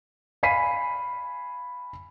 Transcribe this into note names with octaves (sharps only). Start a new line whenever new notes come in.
F5 G#5 B5 B6 C7 D#7